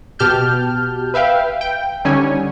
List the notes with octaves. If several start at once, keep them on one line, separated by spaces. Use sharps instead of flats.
B2 G4 A5 F6 G6
B4 E5 F5 G5
G5
D3 G3 C#4 D#4 C#5 G#5